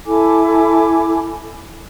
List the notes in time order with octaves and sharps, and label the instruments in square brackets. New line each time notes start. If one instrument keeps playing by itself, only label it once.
[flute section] E4 A4 G#5 D6